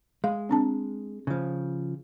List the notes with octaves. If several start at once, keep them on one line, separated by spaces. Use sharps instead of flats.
G#3 F5
C4 D4 A5
C#3 F3